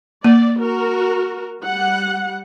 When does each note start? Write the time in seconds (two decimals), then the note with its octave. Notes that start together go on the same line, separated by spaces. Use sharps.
0.24 A#3 D5
0.60 F#4 A#4
1.62 G3 F#5